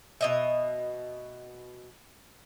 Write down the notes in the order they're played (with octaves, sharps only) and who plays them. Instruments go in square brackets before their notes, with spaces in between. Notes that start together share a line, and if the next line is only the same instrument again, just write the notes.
[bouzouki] B2 D#5 E5